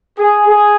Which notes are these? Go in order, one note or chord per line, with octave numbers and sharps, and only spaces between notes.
G#4
G#4